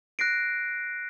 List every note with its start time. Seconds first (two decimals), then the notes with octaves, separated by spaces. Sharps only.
0.19 F#6 A#6 C7 D7